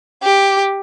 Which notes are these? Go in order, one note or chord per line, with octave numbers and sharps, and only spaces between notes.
G4